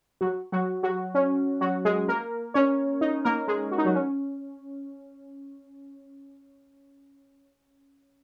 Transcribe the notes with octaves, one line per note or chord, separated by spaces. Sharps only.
F#3 F#4
F#3 F#4
F#3 F#4
C#4
F#3 F#4
G#3 G#4
A#3 A#4
C#4 C#5
D#4
A#3 A#4
G#3 G#4
F#4
D#4
F#3 F#4
C#4